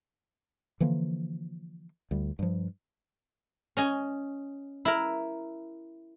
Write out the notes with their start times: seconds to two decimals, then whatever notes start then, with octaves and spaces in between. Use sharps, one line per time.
0.80 D3 E3 F3 A#3
2.11 D2 G3
2.39 G2 F3
3.77 C#4 D#5 G#5
4.85 E4 A#4